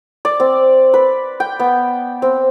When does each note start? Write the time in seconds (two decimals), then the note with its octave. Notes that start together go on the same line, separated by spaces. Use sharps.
0.25 D5
0.40 C4
0.94 B4
1.40 G5
1.59 B3
2.22 C4